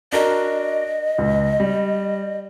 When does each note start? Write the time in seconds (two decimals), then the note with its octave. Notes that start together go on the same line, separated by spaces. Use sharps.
0.12 D4 F#4 A#4 D#5
1.18 C#2
1.60 G3